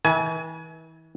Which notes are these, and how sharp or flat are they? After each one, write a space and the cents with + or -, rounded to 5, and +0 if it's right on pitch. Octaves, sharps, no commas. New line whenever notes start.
E3 -35 G#5 +25